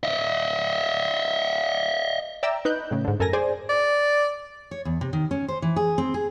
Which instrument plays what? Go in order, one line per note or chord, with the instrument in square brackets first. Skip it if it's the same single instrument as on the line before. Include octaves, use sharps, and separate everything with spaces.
[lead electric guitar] D#5 E5
[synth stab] D5 E5 G5 A#5 E6
D#4 B4 F#6 G6
A2 C#3
G#2 D3
F#2 A4 A#4 G#5 A#6
G#4 C5 D5 G#5
[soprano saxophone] D5
[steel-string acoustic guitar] C#5
E2
C3
D#3
C#4
C5
E3
G#4
C4
G#4